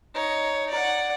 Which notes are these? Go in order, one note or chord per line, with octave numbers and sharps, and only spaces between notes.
D#4 C#5
D5 F#5